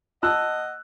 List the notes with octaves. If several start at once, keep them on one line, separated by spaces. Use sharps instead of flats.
D#5 F#5 A5 E6 F#6